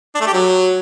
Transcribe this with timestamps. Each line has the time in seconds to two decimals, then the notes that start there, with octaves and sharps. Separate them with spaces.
0.15 D4
0.21 A3
0.27 G4
0.33 F#3